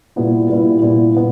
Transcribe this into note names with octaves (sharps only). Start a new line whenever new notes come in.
A#2 G3 B3 E4
A#2 G3 B3 E4
A#2 G3 B3 E4
A#2 G3 B3